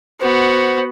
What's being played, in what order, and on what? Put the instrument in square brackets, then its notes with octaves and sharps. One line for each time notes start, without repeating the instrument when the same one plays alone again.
[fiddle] B3 F#4 [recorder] C5